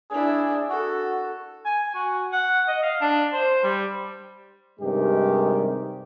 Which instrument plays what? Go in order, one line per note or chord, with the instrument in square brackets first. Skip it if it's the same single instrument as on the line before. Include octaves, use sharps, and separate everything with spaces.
[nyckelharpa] D4 E4 [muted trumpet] G#4
[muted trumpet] F#4 [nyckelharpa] A4
[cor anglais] G#5
F#4
F#5
D#5
F5
D4
C5
G3
[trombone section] G2 C3 D#3 G#3 G4